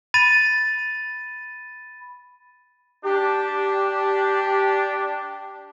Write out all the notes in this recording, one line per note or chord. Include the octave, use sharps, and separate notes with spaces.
B5 A6 D#7
D4 G4